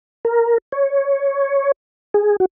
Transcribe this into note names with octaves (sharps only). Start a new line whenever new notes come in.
A#4
C#5
G#4
F#4